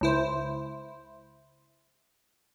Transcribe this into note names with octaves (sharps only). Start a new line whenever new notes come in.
C#2 E4 C5